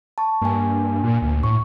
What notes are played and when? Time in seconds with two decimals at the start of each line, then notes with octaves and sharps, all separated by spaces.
0.18 A5 C#6
0.41 G2 A#3 G#5
1.03 A#2
1.22 D2
1.43 A2 C#6